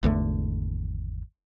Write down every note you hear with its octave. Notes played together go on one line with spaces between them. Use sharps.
G#1 E2 D3 A3